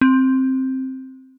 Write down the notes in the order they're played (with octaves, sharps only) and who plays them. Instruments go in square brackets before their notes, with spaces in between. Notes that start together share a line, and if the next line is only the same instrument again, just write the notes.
[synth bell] C4